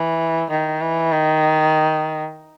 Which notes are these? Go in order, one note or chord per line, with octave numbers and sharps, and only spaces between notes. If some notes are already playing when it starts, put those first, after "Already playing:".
Already playing: E3
D#3
E3
D#3